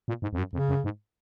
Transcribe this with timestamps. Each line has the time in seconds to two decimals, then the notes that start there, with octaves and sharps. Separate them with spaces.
0.08 A#2
0.22 G#2
0.33 F2
0.38 F#2
0.53 F2 C#3
0.69 F#2
0.84 G#2